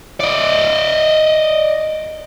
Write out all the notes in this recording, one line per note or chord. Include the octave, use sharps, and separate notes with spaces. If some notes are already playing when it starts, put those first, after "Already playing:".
D5 D#5